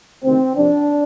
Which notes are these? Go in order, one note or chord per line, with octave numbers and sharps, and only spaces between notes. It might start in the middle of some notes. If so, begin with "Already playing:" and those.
D2 C3 D#3 C4
F2 C3 F3 D4